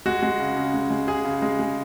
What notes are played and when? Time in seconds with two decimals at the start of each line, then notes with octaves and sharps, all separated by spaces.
0.06 G#3 F#4
0.23 G#3
0.40 C#3
0.56 C#3
0.74 G#3
0.90 G#3
1.08 C#3 G#4
1.25 C#3
1.42 G#3
1.59 G#3